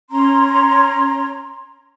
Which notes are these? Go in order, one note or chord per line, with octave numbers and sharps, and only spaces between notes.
C#4 A#5 C6